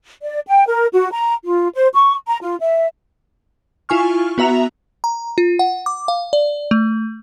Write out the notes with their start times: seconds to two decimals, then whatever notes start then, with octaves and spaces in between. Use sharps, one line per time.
0.22 D5
0.47 G5
0.67 A#4
0.92 F#4
1.12 A#5
1.45 F4
1.75 C5
1.94 C#6
2.28 A#5
2.42 F4
2.60 E5
3.89 E4 F4 G#5 C#6 F6
4.38 B3 F#4 E5 A#5 F7
5.04 A#5
5.38 F4
5.59 F#5
5.86 D6
6.08 F5
6.33 D5
6.71 A3